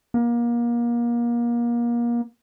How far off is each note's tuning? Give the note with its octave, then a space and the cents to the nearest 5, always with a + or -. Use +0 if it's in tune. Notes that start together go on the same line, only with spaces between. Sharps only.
A#3 +30